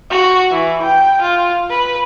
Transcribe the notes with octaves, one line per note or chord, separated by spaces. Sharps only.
F#4
E3
G5
F4
B4